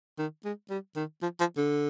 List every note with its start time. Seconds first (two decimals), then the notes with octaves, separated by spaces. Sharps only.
0.18 D#3
0.44 G#3
0.70 G3
0.96 D#3
1.22 F3
1.40 F3
1.57 D3